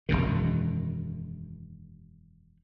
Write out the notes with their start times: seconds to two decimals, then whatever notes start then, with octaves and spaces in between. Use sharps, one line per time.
0.09 E1 A#1 F#2 D#3